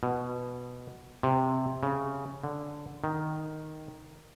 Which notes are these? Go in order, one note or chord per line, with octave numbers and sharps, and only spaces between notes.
B2
C3
C#3
D3
D#3